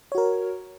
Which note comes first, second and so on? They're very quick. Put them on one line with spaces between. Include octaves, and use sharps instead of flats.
C#5 F#4 A#4